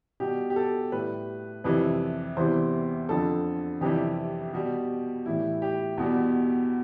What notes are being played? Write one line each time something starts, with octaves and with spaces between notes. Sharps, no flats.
B2 G3 G4
G4
A4
A2 G3 B4
F2 C3 E3 G3 B4
E2 C3 E3 G3 C5
F2 D3 F3 A4
F2 C3 E3 G3 G4
B2 G3
A2 E3 G3 E4
G4
E2 B2 G3